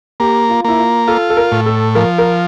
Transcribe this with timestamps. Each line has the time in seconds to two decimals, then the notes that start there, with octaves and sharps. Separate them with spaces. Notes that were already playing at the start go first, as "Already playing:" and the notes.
0.20 A#3 G4
0.50 F4
0.64 A#3 E4
0.79 F4
1.08 F4 A4
1.30 A4
1.37 A#4
1.52 A2
1.66 A4
1.95 F3 A#4
2.18 A#4